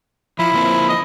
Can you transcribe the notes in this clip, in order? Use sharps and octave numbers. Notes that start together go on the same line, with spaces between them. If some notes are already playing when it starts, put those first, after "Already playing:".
F3 E4
F3 A#3 C4
D#5